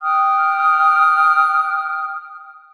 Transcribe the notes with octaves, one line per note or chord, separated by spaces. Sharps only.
G5 D#6 F6 F#6